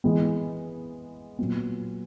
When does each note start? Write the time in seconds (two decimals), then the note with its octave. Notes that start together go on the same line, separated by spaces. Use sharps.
0.04 E3 G#3 B3
1.39 A#2 F#3 B3